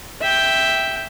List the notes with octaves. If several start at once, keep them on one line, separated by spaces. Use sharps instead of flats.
E5 G5